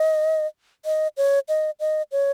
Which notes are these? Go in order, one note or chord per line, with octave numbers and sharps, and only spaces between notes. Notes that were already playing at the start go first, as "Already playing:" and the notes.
Already playing: D#5
D#5
C#5
D#5
D#5
C#5